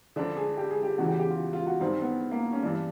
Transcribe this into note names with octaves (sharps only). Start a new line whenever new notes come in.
F2 D3 D4
G#4
G4
G#4
G4
E2 C#3 E3 F#4
G4
G4
F4
F4
F#4
G2 D#3 C4
B3
A#3
C#4
G2 E3 D4